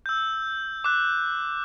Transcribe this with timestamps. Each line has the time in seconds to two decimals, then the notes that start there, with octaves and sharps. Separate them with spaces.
0.06 E6 G6
0.84 D6 F#6